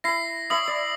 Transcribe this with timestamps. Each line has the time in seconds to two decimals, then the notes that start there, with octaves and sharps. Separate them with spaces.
0.04 E4 B5 A#6 C7
0.50 E4 C#5 E5 D#6 F#7
0.68 D5